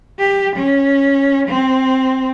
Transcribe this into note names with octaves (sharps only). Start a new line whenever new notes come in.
G4
C#4
C4